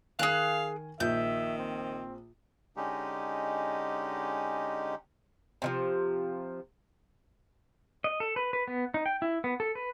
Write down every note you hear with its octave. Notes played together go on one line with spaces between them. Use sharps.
D#3 G#4 A#4 F5 G#5 F#6
A#1 D#3 E5 G6
C4
D3 G#3 C#4 D#4 G4
C3 D#3 F3
D#5
A4
B4
B4
B3
D#4
G5
E4
B3
A4
B4